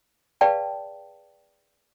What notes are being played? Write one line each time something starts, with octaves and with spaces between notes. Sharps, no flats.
G#4 B4 D5 F5 G5 A5